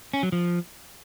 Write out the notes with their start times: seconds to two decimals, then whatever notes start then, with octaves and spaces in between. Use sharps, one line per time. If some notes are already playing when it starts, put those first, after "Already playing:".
0.14 C#4
0.23 F#3
0.32 F3